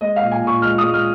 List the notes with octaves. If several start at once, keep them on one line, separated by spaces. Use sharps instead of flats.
G#3 D#5
F5
A#2
G#5
A#2
C#6
G#3 F6
G#3 D#6
F6